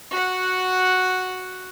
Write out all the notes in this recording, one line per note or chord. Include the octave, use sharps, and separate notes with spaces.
F#4 F#5